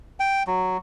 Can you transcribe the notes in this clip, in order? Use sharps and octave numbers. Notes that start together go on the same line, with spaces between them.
G5
F#3